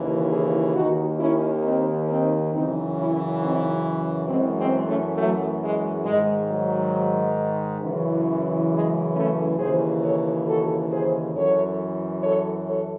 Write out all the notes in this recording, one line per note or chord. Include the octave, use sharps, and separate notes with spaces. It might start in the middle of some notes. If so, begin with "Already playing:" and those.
Already playing: D#2 C#3 E3
E4 G#4
D#2 D#3 D#4 F#4
C#4 E4
C4 D#4
C4 D#4
F#2 C#3 E3 C4 D#4
C#4 E4
C4 D#4
F#2 E3 G#3 C4
G#3 C4
A3 C#4
F#3 A3
G#3
G#2 D#3 G#3
F#3
F#2 C#3 E3
G#3
A3 C#4
D#2 C#3 E3 G#4 C5
A4 C#5
F#4 A4
G#4 C5
F#2 E3 A4 C#5
A4 C#5
A4 C#5